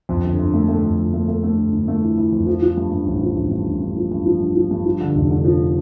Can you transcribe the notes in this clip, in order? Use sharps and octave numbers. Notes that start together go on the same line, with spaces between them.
F2
G1
G1
A3
A3
F2
F2
A3
A3
A3
G1
G1
A3
E3
E3
F2
F3
F3
G2
G2
A1
F3
A1
G2
A1
G2
F3
G2
F3
G2
F3
G2
F3
D3
F1
D3
F3